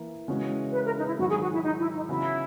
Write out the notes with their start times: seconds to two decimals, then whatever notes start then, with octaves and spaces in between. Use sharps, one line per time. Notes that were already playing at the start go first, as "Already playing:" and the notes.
Already playing: E3 A#3 E4
0.28 C#3 E3 G#3 C#4 F#4
0.73 B4
0.84 A#4
0.96 D#4
1.07 E4
1.18 G#2 D#3 F#3 F#4
1.30 G#4
1.41 F#4
1.53 E4
1.64 D#4
1.79 E4
1.94 D#4
2.09 C#3 E3 B3 E4 F#4